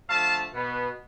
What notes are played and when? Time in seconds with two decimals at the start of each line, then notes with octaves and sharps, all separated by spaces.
0.09 D3 F3 A3 F5 A5
0.52 B2 B3